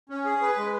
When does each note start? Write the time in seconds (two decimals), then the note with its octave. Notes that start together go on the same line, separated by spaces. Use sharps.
0.10 C#4
0.25 G#4
0.42 B4
0.57 G#3